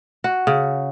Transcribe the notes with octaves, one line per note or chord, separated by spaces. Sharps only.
F#4
C#3